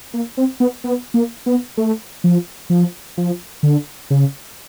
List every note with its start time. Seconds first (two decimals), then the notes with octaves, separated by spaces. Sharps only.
0.14 A#3
0.37 C4
0.60 B3
0.84 B3
1.14 A#3
1.46 B3
1.78 A3
2.24 F3
2.70 F3
3.17 F3
3.63 D3
4.10 C#3